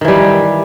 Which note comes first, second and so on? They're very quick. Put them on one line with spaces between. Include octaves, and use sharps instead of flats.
D#3 E3 G3